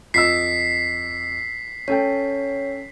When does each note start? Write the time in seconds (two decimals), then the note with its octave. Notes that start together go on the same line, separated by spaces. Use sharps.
0.14 F2 D#5 E6 B6 C7
1.88 C#4 A4 C#5 G5